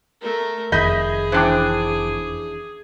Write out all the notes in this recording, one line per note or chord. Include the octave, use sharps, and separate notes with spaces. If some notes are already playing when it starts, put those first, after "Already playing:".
A3 A#4
F1 F2 D#3 G#4 D#5 E5 B5 G6
E3 D4 C5 G5 D6